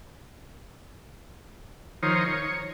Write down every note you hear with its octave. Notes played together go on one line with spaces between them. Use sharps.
D#3 F3 D#4 A#4 C5 C#5
C#5